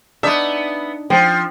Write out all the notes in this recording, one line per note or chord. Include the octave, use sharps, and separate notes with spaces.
B3 D4 D#4 E5
F3 C4